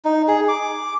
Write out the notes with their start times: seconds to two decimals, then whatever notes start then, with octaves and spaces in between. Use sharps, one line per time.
0.05 D#4
0.28 G#4
0.48 D6